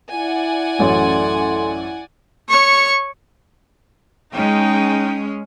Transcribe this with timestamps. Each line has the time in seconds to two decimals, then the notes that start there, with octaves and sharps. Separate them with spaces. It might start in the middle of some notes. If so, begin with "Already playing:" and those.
0.12 E4 D5 F#5 G#5
0.79 A1 F#2 A4 C6
2.49 C#5 C#6
4.34 G#3 C#4 D#4 G5